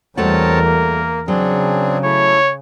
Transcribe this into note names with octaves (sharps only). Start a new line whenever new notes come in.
E2 G3 A3 C4 F#4 A#4 C#5 A5
A#3
C#3 F#3 C4 D4 G#4
A3 E4 C#5